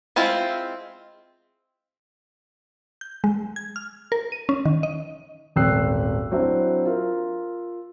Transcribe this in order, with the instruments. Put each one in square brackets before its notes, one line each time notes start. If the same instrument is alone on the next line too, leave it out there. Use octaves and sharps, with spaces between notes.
[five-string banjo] G#3 C4 E4 F4
[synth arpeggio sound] G6
G#3
G#6
F6
A#4
D#7
C#4
D#3
D#5
[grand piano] D#1 G#1 G5 E6 F#6 C7
F#3 C4 D4 E4
F4 A#4